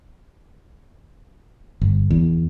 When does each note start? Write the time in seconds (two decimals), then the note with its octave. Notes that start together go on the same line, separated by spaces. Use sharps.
1.82 G1
2.11 E2